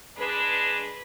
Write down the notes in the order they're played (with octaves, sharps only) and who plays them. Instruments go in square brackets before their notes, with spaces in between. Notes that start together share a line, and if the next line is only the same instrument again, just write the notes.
[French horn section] G#3 D4 [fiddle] B4